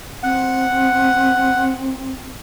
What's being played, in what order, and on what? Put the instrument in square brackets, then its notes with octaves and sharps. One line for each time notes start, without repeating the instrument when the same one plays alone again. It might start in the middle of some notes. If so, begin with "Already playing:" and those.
[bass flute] C4 [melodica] F#5